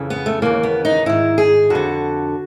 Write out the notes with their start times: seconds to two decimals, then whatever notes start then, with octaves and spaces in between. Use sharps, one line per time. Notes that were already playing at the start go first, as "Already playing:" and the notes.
Already playing: F2 C#3 E3
0.10 B3
0.26 A3
0.42 D#2 C#3 E3 A#3
0.63 B3
0.85 D#4
1.06 G#2 D#3 E4
1.38 G#4
1.70 F2 D3 F#4